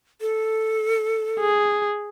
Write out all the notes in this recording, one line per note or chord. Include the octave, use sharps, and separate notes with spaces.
A4
G#4